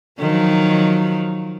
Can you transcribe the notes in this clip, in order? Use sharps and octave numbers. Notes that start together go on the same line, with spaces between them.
D#3 F3 F#3